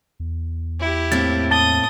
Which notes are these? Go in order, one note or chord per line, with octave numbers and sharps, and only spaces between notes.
E2
E4 G4
A2 A#3 C4 A6
A5 D#6 A6 G7